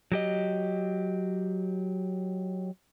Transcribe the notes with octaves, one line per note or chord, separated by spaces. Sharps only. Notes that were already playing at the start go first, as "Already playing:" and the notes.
F#3 G4 D#5